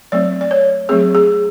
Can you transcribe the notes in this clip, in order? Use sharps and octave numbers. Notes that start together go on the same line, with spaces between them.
F#3 A3 C4 D5
D5
C#5
F#3 A3 C4 G#4
G#4